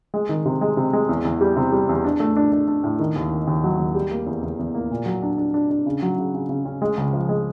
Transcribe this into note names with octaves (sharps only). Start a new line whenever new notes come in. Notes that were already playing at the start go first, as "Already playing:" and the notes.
G#3
D#3
C3
G#3
C3
G#3
E2
E2
G3
C3
G3
E2
D4
A3
D4
D4
D4
A2
D#3
D#2
D#3
D#2
F#3
D#2
G3
A#3
E2
E2
E2
A#3
A#2
F#3
D4
D4
D4
D4
C#3
F#3
C#3
C#3
C#3
C#4
G#3
C#2
F3
G#3